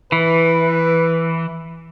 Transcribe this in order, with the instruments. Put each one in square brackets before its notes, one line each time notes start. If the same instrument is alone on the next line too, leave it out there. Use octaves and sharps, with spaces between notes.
[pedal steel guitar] E3 [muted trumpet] B4